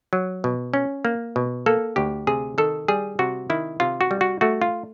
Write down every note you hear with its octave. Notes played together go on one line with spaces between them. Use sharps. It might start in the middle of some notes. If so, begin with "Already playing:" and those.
F#3
B2
C#4
A#3
B2
A#3 A4
D2 G4
C3 G#4
D#3 A4
G3 G#4
C3 F#4
D#3 E4
C3 F4
F#4
G3
F#4
A3 F#4
F4